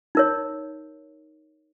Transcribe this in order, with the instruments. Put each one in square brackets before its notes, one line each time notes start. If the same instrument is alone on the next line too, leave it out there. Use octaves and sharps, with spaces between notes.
[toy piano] D#4 A#4 C#5